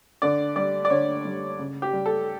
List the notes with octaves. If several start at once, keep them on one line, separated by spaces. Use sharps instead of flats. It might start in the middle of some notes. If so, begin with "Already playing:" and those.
D3 D5
G3 D5
D5
D3 C#5
G3
C#3
G4
G3
A4